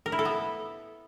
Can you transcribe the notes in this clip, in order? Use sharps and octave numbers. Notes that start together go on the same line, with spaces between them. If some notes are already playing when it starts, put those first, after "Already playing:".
A#4
E4
A4
B3